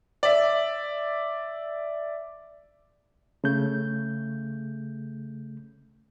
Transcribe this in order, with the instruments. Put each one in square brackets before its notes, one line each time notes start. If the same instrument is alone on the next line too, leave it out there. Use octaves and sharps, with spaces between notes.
[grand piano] D5 E5
[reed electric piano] C#3 A3 G6